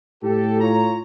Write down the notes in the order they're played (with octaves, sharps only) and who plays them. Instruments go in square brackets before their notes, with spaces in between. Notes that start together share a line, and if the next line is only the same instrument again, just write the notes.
[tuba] A2 [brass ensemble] G4 A4
[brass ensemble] F4 C#5 A#5